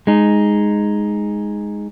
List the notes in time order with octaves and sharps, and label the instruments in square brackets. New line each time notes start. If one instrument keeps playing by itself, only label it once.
[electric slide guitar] G#3 D#4